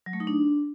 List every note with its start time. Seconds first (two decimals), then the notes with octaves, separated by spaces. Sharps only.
0.06 F#3
0.13 A3
0.20 D#4
0.27 D4